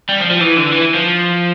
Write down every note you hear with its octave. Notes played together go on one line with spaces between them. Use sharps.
G3
F3
F3
E3
D3
E3
F3